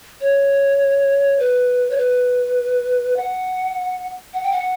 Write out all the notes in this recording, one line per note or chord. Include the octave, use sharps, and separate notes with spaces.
C#5
B4
C#5
B4
F#5
F#5
G5
F#5